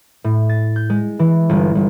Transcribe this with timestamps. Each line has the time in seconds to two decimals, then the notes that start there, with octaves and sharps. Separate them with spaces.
0.24 A2
0.49 A6
0.76 G6
0.90 G#3
1.19 E3
1.49 G1
1.75 G1